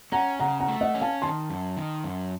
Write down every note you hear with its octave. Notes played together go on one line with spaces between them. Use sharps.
C#4 F#5 A#5
C#3 F#5 A#5
F#5 A#5
A3
D#5 F#5
C#4
F5 A5
D#3 A5 C6
F#2
D#3
F#2